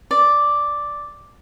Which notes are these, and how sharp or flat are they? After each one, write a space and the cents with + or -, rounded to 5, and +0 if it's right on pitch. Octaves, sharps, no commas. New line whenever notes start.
D5 +0